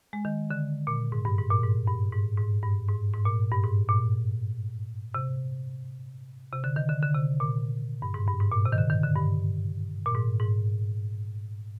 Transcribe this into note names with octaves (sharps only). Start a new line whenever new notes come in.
G#3
D#3
D3
A#2
G#2
G2
G#2
A#2
G#2
G2
G#2
G#2
G2
G#2
G#2
A#2
G2
G#2
A#2
C3
C3
D3
D#3
D3
D3
C3
A#2
G2
G#2
G2
G#2
A#2
C3
D#3
D3
D#3
D3
G2
A#2
G#2
G#2